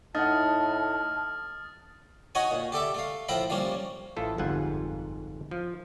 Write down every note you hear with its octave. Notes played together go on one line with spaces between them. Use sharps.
A2 D#4 F#5 A5 D#6 F6 A6
D#4 F#4 C#5 D#5 F#5 G#5
A#2
G4 A4 D5 E5
A3 F5
A2 F3 A#4 E5 G5 B5
F3 G3 A#3 C#4
A1 E4 F4 A4
G1 F2 G#2 F4 F#5 G#5
F3